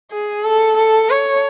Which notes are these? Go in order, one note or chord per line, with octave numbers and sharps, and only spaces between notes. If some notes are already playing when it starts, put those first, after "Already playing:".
G#4
A4
A4
C#5